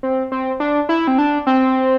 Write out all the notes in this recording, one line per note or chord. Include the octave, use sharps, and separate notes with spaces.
C4
C4
D4
E4
C4
D4
C4